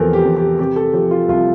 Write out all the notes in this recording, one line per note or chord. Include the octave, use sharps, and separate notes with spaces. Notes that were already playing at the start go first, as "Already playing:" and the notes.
Already playing: E2 C3 F3 A4 A#4
G4
E2
G4
C3 G4
A4
F3 G4
F4
C2 F4